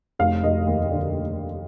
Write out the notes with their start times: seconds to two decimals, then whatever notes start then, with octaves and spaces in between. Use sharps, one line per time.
0.19 F1 F5
0.43 F1 D#5
0.66 D#2
0.91 D3